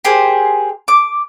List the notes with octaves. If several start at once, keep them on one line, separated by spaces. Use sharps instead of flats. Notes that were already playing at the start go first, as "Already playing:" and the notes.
G4 G#4 A#4 C5
D6